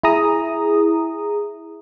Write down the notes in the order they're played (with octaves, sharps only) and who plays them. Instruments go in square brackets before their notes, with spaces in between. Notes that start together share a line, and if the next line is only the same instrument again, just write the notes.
[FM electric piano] E4 G#4 A#5 D#6